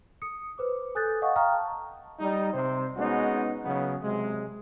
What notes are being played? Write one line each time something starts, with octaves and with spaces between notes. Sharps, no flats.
D#6 C#7
B4 C5 D6
A4 G#5 D#6 F#6 G6 A6
D#5 F5 F#5 G#5 C#6 D#6
F5 G5 A#5 C#6 D#6 F6
A5
G3 D#4
C3 C5
G#3 B3 C#4 D#4 F#4
C#3 F#3 B3
C3 F#3 G#3